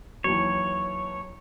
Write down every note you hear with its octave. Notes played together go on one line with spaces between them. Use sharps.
D#2 E3 F#3 C#5